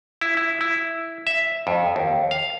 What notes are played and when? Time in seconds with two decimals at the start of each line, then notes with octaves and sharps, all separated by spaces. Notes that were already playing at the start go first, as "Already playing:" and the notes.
0.21 E4
0.37 E4
0.61 E4
1.27 E5
1.67 F2
1.96 D#2
2.31 F5